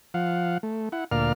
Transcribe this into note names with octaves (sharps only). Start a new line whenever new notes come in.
F3 F5 F#5
A3
E4 F#5
D2 A#2 A#4 D5 F5 F6